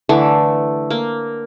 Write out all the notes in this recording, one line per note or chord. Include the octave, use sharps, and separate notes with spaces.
D3 E3 A3
A#3